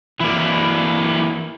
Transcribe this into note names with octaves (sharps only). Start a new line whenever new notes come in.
E3 A#3 E4 D5